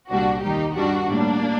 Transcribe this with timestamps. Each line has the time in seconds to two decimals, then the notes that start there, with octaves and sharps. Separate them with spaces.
0.10 C2 A#2 G3 D4 F#4
0.43 D#2 D#3 G3 D#4 G4
0.76 G2 D#3 G3 D4 F#4
1.08 A2 G3 A#3 D4